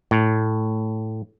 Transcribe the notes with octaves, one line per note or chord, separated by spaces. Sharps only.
A2